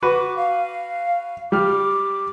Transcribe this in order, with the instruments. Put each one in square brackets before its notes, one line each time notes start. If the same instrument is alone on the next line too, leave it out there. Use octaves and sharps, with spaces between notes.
[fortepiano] F#4 B4 [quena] D6
[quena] F5
[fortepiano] G3 F6 [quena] D6